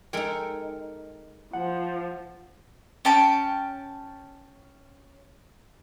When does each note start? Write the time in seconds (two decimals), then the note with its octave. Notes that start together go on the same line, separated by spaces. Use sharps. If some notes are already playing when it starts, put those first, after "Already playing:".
0.13 G#3 D#4 A4 A#4 G5
1.53 F3 F#5
3.05 C#4 G5 A5